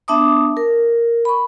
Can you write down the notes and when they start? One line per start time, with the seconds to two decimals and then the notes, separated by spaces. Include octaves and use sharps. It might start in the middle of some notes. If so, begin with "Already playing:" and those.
0.08 B3 D4 E5 A5 D6 D#6
0.57 A#4
1.25 B5 C#6